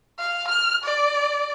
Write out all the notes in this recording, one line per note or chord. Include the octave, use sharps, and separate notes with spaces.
F5
F6
D5